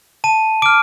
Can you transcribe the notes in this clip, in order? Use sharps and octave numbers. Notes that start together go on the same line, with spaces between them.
A5 D#7
D6 F6 D7